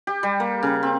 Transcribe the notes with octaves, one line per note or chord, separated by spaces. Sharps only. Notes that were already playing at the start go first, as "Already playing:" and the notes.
G4
G3
A#3
C#3
C4